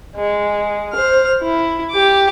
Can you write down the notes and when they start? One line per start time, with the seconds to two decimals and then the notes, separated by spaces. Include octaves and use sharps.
0.16 G#3
0.93 C5 F6
1.42 E4
1.91 G4 D6